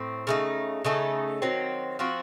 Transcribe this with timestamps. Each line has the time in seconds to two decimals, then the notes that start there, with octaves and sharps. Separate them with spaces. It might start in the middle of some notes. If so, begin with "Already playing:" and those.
Already playing: A2 C4
0.27 C#3 A3 D#4
0.84 C#3 A3 D#4 A4
1.42 D#3 F#3 C4
1.99 F3 C4 F#4